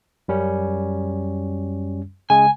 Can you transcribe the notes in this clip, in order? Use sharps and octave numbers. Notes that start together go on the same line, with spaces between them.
F#2 G3 C#4
C#3 G#3 G#5